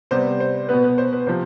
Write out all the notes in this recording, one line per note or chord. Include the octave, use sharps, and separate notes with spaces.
C3 G3 B3 C5
C5
B2 B3 B4
B4
C5
B4
C3 F3 C5